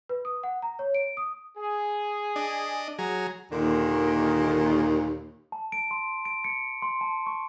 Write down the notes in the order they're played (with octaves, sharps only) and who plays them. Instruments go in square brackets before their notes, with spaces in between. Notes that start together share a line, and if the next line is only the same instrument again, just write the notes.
[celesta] B4
D#6
F#5
A#5
C#5
D7
D#6
[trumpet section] G#4
[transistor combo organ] D4 D#5
F#3 G#4 A#5
[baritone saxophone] D#2 [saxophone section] A#2 D3 D#3
[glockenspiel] A5
D7
C6
D7
C#7
C6
A5
C#6